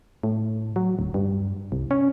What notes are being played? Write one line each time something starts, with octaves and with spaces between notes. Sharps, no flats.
A2
F#3
D1
G2
C2
C#4